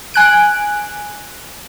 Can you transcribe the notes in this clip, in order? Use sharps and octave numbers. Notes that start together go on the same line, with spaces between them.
G#5 F#6 D7